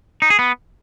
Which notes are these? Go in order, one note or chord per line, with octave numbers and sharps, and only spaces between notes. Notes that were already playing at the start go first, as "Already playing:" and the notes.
D#4
G#4
B3